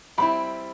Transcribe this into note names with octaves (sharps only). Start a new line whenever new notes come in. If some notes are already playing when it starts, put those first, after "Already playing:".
G3 C4 E4 B5